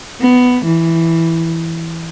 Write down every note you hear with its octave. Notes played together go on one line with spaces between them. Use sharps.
B3
E3